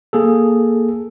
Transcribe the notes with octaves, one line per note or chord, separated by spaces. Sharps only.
A#3 G#4 A4